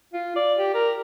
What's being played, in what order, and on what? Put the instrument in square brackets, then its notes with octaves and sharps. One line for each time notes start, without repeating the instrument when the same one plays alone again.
[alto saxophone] F4
D5
G4
A#4